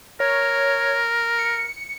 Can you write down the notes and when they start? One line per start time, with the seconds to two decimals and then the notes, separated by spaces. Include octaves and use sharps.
0.20 A#4 C#5
1.39 C#7